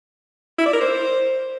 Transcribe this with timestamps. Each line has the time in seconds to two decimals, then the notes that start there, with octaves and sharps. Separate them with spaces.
0.58 E4
0.66 D5
0.73 A#4
0.81 C5